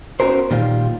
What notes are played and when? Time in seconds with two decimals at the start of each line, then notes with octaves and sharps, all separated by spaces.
0.20 B3 C#4 F#4 G#4 A#4 C5
0.51 A#2 D#3 G3 F4